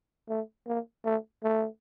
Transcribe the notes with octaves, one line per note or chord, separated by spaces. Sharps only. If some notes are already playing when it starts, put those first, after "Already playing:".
A3
A#3
A3
A3